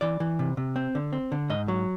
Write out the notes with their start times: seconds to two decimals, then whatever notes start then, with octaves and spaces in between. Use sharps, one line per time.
0.01 E3 D5
0.20 E3
0.39 C3
0.57 C3
0.76 C4
0.95 D3
1.13 C4
1.32 D3
1.50 G#2 D#5
1.68 F#3